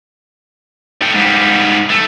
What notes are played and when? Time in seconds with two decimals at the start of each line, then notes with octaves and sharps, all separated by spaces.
1.02 A4 G5
1.15 G#2 G3
1.90 A3